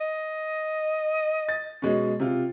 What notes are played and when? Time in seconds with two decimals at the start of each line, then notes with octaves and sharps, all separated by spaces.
0.01 D#5
1.49 A6
1.82 B2 G#3 C#4
2.20 C3 F4